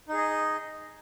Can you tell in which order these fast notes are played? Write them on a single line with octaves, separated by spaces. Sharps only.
D#4 G#4 D#5